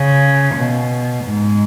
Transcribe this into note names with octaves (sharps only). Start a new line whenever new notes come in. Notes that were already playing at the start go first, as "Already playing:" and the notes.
Already playing: C#3
B2
G#2